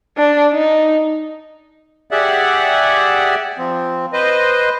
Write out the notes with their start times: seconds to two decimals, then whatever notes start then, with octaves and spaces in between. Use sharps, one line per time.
0.17 D4
0.53 D#4
2.11 G4 G#4 D5 E5 F#5
3.58 F3 C4
4.13 B4 C5 D#5